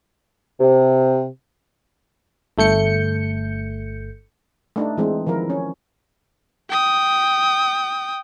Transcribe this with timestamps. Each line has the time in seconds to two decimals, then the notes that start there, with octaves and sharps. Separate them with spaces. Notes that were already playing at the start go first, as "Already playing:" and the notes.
0.59 C3
2.58 G1 A3 G6 C#7
4.76 A3 D4 D#4
4.97 E3 G#3 C4
5.27 D#3 F3 E4 A#4
5.50 C#4
6.70 G5 D#6